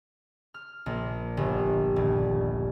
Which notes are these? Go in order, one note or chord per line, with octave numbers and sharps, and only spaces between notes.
F6
A#1
G1
D#1